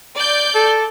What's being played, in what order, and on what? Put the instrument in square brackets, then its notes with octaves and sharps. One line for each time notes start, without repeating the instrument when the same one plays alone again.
[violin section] D5 G6
[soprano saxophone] A4